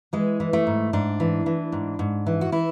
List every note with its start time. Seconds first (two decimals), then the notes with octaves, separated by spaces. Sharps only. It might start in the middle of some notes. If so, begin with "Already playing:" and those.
0.13 E3 G#3
0.40 E3
0.53 A3
0.67 G#2
0.93 G#2 D4
1.20 E3
1.46 E3
1.72 G#2
1.99 G#2
2.26 E3
2.41 F#4
2.52 E3 E4